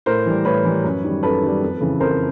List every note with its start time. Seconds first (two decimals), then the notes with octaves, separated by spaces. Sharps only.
0.06 A2 A#4 C5
0.26 E3 G3
0.45 A2 B4 C#5
0.65 E3 G3
0.84 F#2
1.04 D#3 G3
1.23 F#2 A4 B4
1.42 D#3 G3
1.62 F2
1.81 C#3 E3
2.00 F2 A#4 C5